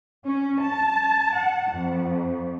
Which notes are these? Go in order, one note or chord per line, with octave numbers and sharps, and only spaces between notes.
C#4
A5
F#5
F2